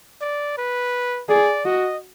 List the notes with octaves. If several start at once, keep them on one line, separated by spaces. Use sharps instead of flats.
D5
B4
G#4 D5
F#4 D#5